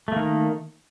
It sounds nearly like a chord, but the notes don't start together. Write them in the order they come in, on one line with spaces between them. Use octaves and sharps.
A3 A#3 D#3